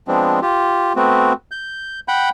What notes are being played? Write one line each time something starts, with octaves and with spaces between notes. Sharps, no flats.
F3 G#3 B3 C4 D4
F4 G4
A3 B3 C4 F#4
G6
F#5 G5 B5 G6